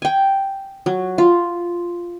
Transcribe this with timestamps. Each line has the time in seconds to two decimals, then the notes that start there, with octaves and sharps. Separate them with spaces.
0.02 G5 G#5
0.86 F#3
1.18 F4